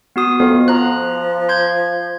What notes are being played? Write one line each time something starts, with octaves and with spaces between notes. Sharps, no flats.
B3 F#4 D#6
F2 B3
F3 A#5 F#6
C6 G6 G#6